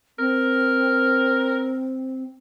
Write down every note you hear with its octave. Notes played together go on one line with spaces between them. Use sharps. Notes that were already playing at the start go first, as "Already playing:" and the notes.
C4 A#4